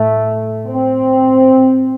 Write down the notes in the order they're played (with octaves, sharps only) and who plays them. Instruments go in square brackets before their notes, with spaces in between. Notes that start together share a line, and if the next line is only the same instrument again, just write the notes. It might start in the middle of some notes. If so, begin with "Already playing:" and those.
Already playing: [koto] A2 [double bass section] A3
[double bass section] C4